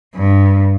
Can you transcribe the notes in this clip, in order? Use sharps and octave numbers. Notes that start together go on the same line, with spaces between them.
G2